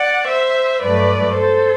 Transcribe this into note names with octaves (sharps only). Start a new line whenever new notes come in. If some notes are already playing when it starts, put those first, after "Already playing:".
Already playing: D5 F#5
C5 E5
G2 F#3 A3 B4 D5
A4 C5